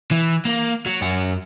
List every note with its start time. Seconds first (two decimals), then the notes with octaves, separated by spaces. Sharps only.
0.11 E3
0.45 A#3
0.86 F#3
1.01 F#2 F#5